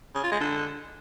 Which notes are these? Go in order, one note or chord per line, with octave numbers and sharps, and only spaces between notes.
C#3
F4
G#3
D3